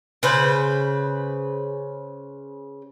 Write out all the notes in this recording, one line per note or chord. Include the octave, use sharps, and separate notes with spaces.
C#3 B4 C5